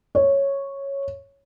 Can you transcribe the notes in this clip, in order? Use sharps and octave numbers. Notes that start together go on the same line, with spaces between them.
C#5